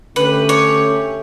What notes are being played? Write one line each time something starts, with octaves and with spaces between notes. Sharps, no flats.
D3 A3 C#4 G4 B4
C#5